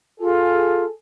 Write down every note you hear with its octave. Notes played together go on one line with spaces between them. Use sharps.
F4 G#4 A4